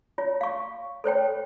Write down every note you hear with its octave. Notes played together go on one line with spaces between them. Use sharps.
F4 C#5
F5 C#6
A4 C5 C#5 G5